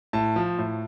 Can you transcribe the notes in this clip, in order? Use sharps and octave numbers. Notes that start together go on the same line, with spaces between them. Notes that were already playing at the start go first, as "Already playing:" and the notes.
A2 A5
F3
A2